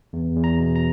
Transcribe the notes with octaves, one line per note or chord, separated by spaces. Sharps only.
E2
E2
A#5
B2
A#5